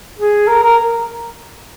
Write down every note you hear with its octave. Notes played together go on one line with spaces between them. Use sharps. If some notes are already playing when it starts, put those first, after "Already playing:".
G#4
A#4
A#4